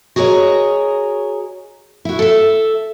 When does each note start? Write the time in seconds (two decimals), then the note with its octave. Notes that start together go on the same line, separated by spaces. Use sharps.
0.16 F#4 G#4 A#4 B4 C#5 D#5
2.05 E4 F#4
2.19 A4 E5